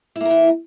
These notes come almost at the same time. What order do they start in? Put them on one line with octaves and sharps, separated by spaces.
E4 A#3 A#4 E3